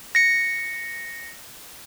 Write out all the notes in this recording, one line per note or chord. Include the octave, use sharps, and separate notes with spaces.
A#6 C#7